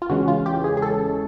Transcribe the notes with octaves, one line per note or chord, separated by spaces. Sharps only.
F4
E2 C#3 E3 G#3 C#4 F#4
F4
G4
G#4
G#4
A4